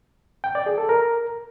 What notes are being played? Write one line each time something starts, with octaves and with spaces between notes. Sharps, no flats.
G5
D5
G#4
A4
A#4